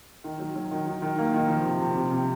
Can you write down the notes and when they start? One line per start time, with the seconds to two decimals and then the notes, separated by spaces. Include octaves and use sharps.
0.24 D#3
0.39 F#3
0.56 F#3
0.71 D#3
0.86 D#3
1.02 D#3
1.18 A#3
1.33 D#3
1.48 F3
1.65 C3
1.80 C3
1.96 C3
2.12 C3